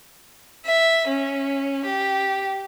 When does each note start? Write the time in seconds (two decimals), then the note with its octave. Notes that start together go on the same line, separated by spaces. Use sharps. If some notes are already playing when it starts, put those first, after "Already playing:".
0.66 E5
1.08 C#4
1.86 G4